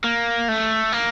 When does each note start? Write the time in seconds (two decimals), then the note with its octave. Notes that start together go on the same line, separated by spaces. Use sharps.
0.04 A#3
0.48 A3
0.92 A#3